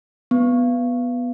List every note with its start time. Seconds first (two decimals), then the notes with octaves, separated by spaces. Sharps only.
0.31 B3